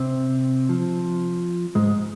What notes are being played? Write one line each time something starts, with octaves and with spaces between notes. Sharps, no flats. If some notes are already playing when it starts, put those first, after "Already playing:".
Already playing: C3 C4
F3
G#2 G#3